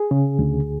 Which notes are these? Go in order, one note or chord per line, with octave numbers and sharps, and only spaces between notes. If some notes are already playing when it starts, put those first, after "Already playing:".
Already playing: G#4
C#3
D2